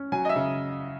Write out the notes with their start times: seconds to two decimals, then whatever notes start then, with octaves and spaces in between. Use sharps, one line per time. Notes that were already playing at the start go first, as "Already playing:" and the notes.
Already playing: C#4
0.12 F#3 G#5
0.25 D#5
0.29 E5
0.36 C#3